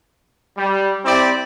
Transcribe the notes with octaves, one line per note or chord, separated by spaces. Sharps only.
G3
C4 E4 G4 D5